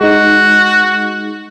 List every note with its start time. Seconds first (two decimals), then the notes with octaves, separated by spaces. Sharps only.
0.01 G#3 D#4 F#4